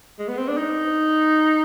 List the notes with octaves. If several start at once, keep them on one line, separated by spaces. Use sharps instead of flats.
G#3
B3
C4
D4
D#4